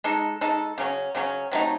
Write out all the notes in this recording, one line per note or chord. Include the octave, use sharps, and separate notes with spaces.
G#3 D#4 A4
G#3 D#4 A4
C#3 F#3 C#4
C#3 F#3 C#4
C3 F#3 A3 D#4